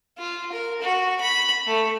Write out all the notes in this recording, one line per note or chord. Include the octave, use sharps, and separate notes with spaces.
F4
A#4
F#4
B5
A3